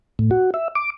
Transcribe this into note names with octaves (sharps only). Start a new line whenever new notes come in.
A2
F#4
E5
D6